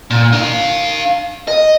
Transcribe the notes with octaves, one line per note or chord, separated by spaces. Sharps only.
A#2
D#4 F5
D#5